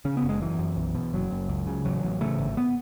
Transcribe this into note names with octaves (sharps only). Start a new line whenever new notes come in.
C#3 C#4
B3
F#1
G#3
F#2 E3
F#2
B1
B2
F#1 F#3
F#1
C#2
C#3
A1 F#3
A1
C#3 A3
G#1
B3